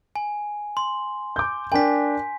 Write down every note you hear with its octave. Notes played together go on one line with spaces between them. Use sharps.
G#5
C6
D6 G6
D4 A#4 G5 G#5 B6